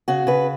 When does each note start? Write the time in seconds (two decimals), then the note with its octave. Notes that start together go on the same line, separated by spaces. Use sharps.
0.08 C#3 F#4
0.27 C#3 B4